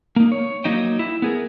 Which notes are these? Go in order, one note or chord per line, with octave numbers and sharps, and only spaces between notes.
A#3 D#4
C#5
F#3 A#3 D#4 C5 G5
E4
B3 G#4 A#4